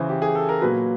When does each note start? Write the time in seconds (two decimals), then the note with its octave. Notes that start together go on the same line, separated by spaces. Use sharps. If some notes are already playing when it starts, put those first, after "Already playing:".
Already playing: C#3 E3 C5
0.09 G4
0.22 G#4
0.35 A4
0.49 A#4
0.61 A#2 F#3 B4